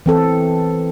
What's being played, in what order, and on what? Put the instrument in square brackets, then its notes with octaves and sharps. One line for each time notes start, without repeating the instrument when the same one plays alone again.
[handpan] E3 C4 A4